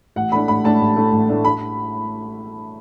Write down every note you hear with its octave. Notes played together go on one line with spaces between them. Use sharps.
A1 F#5
A2 A3 D4 B5
A1 B5
A2 A3 D4 A5
A1
A2 A3 D4
A1
A2 A3 D4
B5